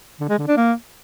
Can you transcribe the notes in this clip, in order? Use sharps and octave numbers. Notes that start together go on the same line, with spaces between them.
D3
G#3
D3
D4
A#3